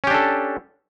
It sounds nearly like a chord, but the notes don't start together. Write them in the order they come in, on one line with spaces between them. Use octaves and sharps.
C#4 G4 D4 A4